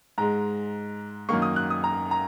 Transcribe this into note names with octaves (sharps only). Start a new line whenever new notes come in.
G#2 G#3 A#5
F#2 D#3 A#3 C#6
D#6
F#6
D#6
A#5
A#5